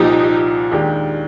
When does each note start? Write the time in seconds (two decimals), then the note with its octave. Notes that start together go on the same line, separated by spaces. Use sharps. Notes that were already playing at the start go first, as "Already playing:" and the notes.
Already playing: C2 A#2 F3 D#4 G4
0.72 D#2 D#3 G#3 D4 G4